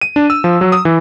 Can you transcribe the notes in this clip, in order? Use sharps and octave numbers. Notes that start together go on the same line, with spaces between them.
D#7
D4
E6
F3
F#3
D#6
E3